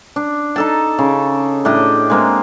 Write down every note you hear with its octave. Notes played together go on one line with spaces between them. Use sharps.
D4
D#4 A4 A5
C#3
A2 D4 G4 D#5
G#3 A#3 C4